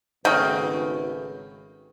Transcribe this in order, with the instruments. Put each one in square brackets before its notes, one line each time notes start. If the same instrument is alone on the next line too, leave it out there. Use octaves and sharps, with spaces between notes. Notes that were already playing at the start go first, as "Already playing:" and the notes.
[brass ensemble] G#1 B4 [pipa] C#3 [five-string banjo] A3 F#4 G5